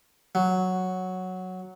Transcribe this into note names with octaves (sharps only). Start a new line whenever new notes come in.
F#3